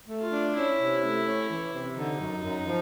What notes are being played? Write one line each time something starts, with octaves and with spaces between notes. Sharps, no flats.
A3
F4
D4
C#4 E4
C3
A3
C#4
E3
C3
D3 D#4
F#2
F#2
F3